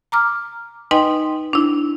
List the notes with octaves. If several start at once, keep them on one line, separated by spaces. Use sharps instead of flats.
A#5 D6 F6
D#4 B4 D#5 G5 G#5 C6
D4 E4